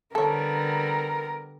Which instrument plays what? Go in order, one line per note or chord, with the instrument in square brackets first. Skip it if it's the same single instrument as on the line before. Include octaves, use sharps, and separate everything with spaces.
[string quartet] D3 G3 B3 [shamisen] A4 C#5 [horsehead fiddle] A#4